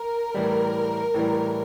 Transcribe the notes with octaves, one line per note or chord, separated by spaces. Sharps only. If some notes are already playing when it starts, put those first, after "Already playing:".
Already playing: A#4
A2 E3 G3
A2 E3 G3